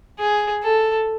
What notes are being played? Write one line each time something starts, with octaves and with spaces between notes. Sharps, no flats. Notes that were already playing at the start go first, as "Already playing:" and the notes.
G#4
A4